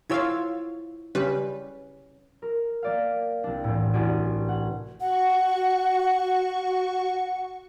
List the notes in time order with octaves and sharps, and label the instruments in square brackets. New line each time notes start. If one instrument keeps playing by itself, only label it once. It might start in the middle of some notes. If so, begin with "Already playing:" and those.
[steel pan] E4 F4 C#5 [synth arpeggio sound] F5 E6 G#6
[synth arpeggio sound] C#3 G3 B4 [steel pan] C#4
[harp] A#4
A#3 D5 F5
C2 D4
E2 A2
A1 D4 F#4 G#6 D7 D#7
F#5
[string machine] F#4 C#6 [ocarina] F#5